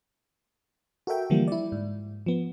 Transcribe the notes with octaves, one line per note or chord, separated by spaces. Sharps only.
F#4 A4 A#4 E5 G5
D3 E3 F3 G3 A#3
E4 D5
G#2
F3 B3